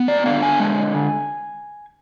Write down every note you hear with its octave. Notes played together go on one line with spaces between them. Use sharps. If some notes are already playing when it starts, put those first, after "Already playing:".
Already playing: B3
D5
D3 F5
G#5
G#3